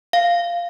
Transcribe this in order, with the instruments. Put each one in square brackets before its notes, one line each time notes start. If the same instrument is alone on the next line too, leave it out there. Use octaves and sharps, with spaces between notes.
[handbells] F5